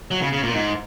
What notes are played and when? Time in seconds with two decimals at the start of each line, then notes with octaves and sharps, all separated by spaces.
0.11 F#3
0.22 C#3
0.32 C#3
0.43 A#2
0.54 G#2